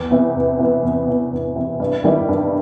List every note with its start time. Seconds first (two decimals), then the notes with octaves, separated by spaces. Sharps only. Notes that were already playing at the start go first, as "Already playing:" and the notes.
Already playing: E2
0.11 C3 E3 B3
0.35 E2
0.59 C3 E3 B3
0.83 E2
1.08 C3 E3 B3
1.31 E2
1.56 C3 E3 B3
1.80 G2
2.04 D#3 G3 B3 E4
2.29 G2